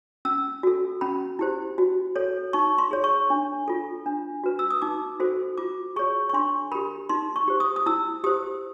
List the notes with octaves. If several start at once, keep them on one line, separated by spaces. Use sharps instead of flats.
C#4 E6
F#4 A4
C#4 B5
E4 G4 C5
F#4
A4 C#5
D#4 C#6
C6
G#4 C#5
C#6
D4
F4 A4
D4
F#4 B4
E6
D#6
D#4 D6
F#4 A4 C5
F4 D6
G#4 C#5 C#6
C#6
D4 C6
G4 A#4 B5
D#4 C6
C#6
G4 C5
D#6
D#6
E4 E6
G4 C5 D#6